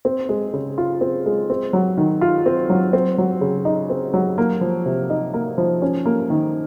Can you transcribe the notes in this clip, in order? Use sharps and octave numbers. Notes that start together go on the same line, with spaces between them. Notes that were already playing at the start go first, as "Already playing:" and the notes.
C4
G#3
C#3
F4
C4
G#3
C4
F#3
D#3
F4
C4
F#3
C4
F#3
C#3
D#4
C4
F#3
A#3
F3
C3
D#4
A#3
F3
C#4
A#3
D#3